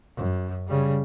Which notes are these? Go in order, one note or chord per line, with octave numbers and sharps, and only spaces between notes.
F#2
C#3 G3